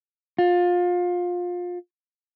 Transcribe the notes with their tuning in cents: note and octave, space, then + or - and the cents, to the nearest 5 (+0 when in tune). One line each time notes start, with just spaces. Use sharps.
F4 +25